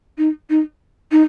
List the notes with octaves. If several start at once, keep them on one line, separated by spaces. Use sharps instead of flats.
D#4
D#4
D#4